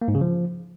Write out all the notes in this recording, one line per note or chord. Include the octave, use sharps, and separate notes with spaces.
A#3
G#2
C#3
F3